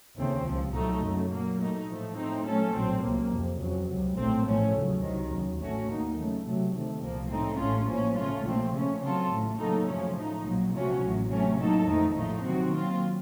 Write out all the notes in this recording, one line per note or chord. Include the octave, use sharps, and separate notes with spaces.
D#2 C#3 A3 C4
C#2 C3 F3
C2 A#2 F#3 A3 D#4
F#2 C#3 F#3 A3
A#2 F#3 A#3
A#2 A3 D#4
A2 F3 A3
A2 A3 C4 D#4
A#2 F#3 A3 C#4 A4
A#1 A2 F#3 C4
C#2 C3 F#3 A#3
F2 C3 F3
F2 C#3 F#3
C#2 C3 F#3
A#1 A2 A3 C4
A1 A2 F3 A3 C#4
D#2 C#3 F#3
C2 C3 D#3 F#3
D#2 C#3 F#3
A1 A2 A3 C#4 F#4
D#2 D#3 A#3 D#4
C#3 F#3 A3
C3 F#3 A3
C3 D#3 A3
C2 A#2 F3 A#3
A2 A3 C4 D#4
A1 A2 A3 C#4 F4
A2 F3 A#3 C#4
C#3 A3 C#4 F4
A#1 A#2 F3 A3 C4
C#3 A3 C#4
C#3 F#3 C4 F4 A4
A1 A2 A3
C#3 F#3 A#3 D#4 A4
F#2 C#3 F3 A3 C#4
A2 A3 D#4
A#1 A#2 F#3
C3 F3 A3 C#4 F#4
A1 A2 F#3
C3 F#3 A3 C#4
A2 F#3 A#3 D#4 A4
F2 D#3 A3 D#4
A#1 A2 F3 A3 D#4
C3 D#3 F#3 C4 F#4
A#2 F#3 C4 F4